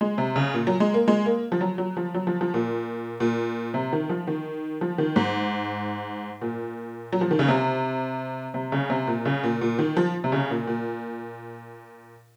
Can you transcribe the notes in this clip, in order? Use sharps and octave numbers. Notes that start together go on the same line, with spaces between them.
G#3
C3
C#3
A#2
F#3
G#3
A#3
G#3
A#3
F3
F#3
F#3
F3
F#3
F3
F3
A#2
A#2
C3
D#3
F3
D#3
F3
D#3
G#2
A#2
F#3
F3
D#3
C#3
C3
C3
C#3
C3
A#2
C#3
A#2
A#2
D#3
F3
C3
C#3
A#2
A#2